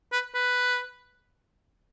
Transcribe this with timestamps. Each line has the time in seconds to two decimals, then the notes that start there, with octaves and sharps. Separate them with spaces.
0.13 B4
0.34 B4